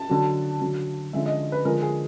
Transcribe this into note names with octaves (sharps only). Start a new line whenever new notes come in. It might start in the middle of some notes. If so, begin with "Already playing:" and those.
Already playing: A5
D3 F#3
D3 F#3
D3 F3 G#3 E5
D#5
B4
D3 F3 G#3 A#4
G#4